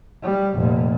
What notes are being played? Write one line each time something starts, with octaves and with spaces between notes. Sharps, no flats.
G3
F1 A#2